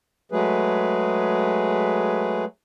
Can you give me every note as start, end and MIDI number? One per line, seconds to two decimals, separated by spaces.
0.32 2.45 54
0.32 2.45 56
0.32 2.45 57
0.32 2.45 68
0.32 2.45 71